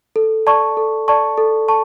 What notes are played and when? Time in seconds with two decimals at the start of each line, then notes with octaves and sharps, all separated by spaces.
0.16 A4
0.47 D5 A5 C#6
0.77 A4
1.08 D5 A5 C#6
1.38 A4
1.68 A5 C#6